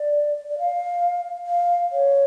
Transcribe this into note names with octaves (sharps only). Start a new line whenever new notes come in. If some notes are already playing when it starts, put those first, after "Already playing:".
Already playing: D5
D5
F5
F5
C#5